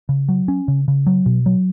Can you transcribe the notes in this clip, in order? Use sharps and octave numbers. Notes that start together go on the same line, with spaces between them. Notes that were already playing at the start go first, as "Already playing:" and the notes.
C#3
F#3
C#4
C#3
C#3
F#3
B2
F#3